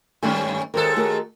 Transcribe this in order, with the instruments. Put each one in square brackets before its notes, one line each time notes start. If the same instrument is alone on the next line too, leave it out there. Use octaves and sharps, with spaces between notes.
[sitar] G2 D#3 C#4 [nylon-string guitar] G3 A3 B4
[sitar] D#2 G#3 A4 [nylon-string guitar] A#4 C5
[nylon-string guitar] A3 F#4 A#4